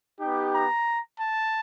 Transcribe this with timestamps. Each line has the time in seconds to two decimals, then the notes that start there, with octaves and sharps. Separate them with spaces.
0.19 B3 D#4 G4
0.52 A#5
1.20 A5